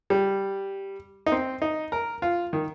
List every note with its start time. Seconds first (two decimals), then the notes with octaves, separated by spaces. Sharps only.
0.10 G3
1.26 D#4
1.32 C4
1.62 D#4
1.92 A#4
2.22 F4
2.53 D#3